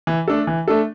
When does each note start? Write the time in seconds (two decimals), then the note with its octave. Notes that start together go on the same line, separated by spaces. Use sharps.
0.07 E3
0.28 A3 D4 A4
0.47 E3
0.68 A3 D4 A4